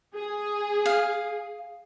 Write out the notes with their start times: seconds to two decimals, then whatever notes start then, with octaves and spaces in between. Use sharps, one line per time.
0.15 G#4
0.86 F5